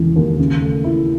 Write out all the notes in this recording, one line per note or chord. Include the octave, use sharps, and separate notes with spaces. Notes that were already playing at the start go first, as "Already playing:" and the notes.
Already playing: E1 C#3 E3
D#2
C#3
A3
E4